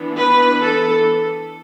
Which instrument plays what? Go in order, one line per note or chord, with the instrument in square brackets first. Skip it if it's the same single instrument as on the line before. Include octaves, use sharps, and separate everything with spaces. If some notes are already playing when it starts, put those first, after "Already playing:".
Already playing: [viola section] E3 B3 D4
B4
A4